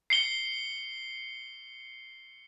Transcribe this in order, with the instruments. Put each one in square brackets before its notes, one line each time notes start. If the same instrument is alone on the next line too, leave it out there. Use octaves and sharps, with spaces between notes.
[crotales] C7 C#7 G7